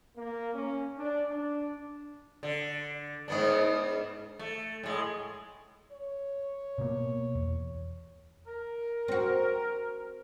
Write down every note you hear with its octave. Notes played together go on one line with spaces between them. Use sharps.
A#3
C#4
D4
D4
D3
G#2 B3 D4
A3
A2 G#3
C#5
B2 A#3
E2
A#4
C4 F#4